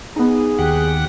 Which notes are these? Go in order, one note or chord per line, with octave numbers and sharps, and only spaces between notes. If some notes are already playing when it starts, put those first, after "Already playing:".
B3 D#4 G#4
D#2 G4 F#5